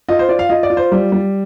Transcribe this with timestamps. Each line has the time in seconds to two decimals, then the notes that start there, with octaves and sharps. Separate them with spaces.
0.09 F4 D#5
0.19 C5
0.29 F4 D5
0.39 F5
0.49 F4 D#5
0.63 D5
0.70 F4
0.77 C5
0.92 G3
1.12 G3